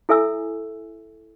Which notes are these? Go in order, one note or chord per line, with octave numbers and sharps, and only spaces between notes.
E4 A4 E5 G#5 E6